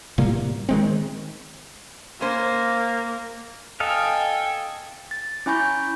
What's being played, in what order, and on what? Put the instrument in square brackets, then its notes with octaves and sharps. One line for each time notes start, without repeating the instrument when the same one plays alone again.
[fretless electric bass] A2 C3 G3 A#3
D#3 G#3 C4
[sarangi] A#3 [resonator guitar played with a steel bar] C#4 C5
[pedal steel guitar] A4 D#5 F5 [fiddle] G5 G#5
[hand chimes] A6
C#4 E4 G#5 B5 C#6 G6